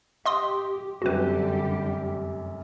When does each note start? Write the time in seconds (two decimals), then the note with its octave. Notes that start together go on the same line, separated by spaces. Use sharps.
0.26 G4 D#5 C6 D#6
1.02 F1 F#2 D3 G3 F#4 G4 B4